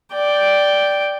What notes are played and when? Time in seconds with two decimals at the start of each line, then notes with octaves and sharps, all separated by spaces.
0.13 D5 G5